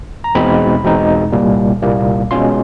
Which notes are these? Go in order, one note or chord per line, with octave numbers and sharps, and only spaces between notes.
A#5
E2 B2 G#3 C4 D#4 B5
E2 B2 G#3 C4 D#4
C2 A#2 G3 A#3
C2 A#2 G3 A#3
B2 G#3 C#4 F4 C6